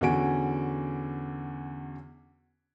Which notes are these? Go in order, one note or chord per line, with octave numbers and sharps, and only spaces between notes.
E2 D3 C#4 F#4 G#5 D7